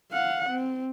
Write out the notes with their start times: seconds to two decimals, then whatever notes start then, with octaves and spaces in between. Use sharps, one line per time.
0.12 F5 F#5
0.50 C4